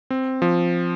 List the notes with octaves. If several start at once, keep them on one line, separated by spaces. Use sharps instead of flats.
C4
F3